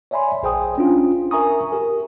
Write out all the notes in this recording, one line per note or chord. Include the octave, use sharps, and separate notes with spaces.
C#5 D5 E5 G#5 B5 C6
A#1 G#4 C5 G5 G#5 D#6
C#4 D4 F4
A#4 E5 G#5 A#5 C#6 D#6
G4 A#4